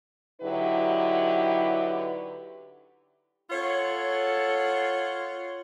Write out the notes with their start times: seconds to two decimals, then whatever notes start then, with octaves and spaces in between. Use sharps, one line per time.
0.41 D3 F#3 D#4 E4 G4 B4
3.51 F4 A4 C#5 F#5